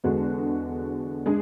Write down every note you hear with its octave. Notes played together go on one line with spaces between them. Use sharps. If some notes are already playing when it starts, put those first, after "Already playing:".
E2 D3 G#3 D4 F#4
G#3 D4 G#4